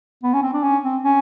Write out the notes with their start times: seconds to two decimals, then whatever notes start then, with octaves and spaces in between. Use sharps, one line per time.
0.23 B3
0.34 C#4
0.43 C4
0.53 D4
0.63 C#4
0.83 C4
1.04 C#4